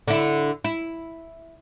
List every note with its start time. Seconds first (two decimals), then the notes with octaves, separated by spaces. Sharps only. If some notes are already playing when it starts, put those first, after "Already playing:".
0.08 D3 E4
0.64 E4